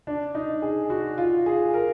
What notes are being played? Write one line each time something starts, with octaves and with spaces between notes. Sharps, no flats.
D4
D#4
G#4
F#4
F4
G#4
A#4